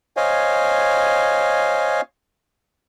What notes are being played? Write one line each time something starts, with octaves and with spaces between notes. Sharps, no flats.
C5 C#5 D#5 F5 G#5